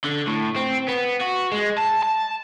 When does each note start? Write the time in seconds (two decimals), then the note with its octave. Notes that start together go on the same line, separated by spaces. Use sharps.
0.04 D3
0.27 A2
0.56 C4
0.88 B3
1.21 F#4
1.52 G#3
1.78 A5
2.03 A5